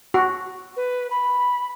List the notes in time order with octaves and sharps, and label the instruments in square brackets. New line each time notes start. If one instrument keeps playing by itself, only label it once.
[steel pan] F#4
[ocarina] B4
B5